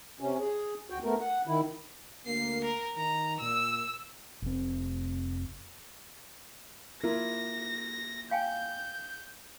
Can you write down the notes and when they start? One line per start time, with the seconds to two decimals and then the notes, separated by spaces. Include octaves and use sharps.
0.20 C3 C#4
0.40 G#4
0.90 D2 F#4 G5
1.04 A3 B3 A#4
1.21 F#5
1.47 D#3 E4
2.26 D2 A#3 C7
2.64 A#4
2.97 D#3 A#5
3.40 A#2 E6
4.42 F1 C4
7.03 A#3 E4 F4 A#6
8.31 F5 G5 G#5 G6